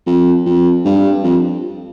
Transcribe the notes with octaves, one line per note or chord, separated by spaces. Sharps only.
F2
F2
G2
F2